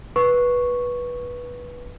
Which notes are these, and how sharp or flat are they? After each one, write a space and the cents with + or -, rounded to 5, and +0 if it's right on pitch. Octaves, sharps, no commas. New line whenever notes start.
B4 -15 C#6 +0